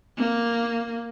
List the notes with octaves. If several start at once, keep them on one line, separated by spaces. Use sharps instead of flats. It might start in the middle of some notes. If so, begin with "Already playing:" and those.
A#3